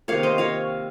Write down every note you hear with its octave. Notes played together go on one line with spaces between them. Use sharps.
C3 D#3 A#3 C#5 F5
C5 D#5
C#5 F5